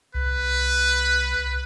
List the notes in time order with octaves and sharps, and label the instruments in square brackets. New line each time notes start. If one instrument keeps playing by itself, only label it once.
[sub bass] C2 [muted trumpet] B4